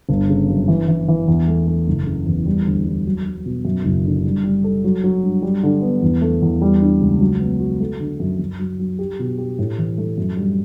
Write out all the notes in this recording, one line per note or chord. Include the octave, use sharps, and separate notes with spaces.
G1
C#3
F#2
E3
E3
E3
E2
A3
A3
F#1
C#3
E2
G3
D2
G3
F#3
F#3
B2
F#2
F#1
D3
G3
G3
A4
F#3
F#3
G2
G3
D3
B3
E2
A3
E2
G3
D4
C#2
F#3
B3
F#4
A3
D3
F#2
F#2
F#3
F#3
G4
B2
G4
A2
E3
A3
F#2
G3